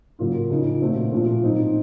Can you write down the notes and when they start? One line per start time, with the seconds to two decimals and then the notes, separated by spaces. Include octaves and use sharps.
0.19 C#3 F#3 A#3 F4
0.50 C#3 F3 A#3 D#4
0.81 A#2 A3 C4 F#4
1.12 A#2 F3 A3
1.43 D#3 F#3 C4 D#4